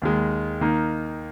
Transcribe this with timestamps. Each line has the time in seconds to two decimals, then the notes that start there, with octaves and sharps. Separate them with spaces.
0.02 D#2 D#3 G#3
0.61 D#3 A#3 D#4